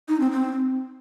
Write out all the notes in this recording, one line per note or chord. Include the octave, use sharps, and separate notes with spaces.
D#4
C4
C4